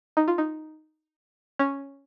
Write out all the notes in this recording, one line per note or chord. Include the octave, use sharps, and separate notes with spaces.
D#4
F4
D#4
C#4